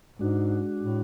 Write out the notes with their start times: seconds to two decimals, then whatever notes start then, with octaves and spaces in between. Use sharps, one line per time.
0.19 G#2 G#3 D4 F#4
0.81 A2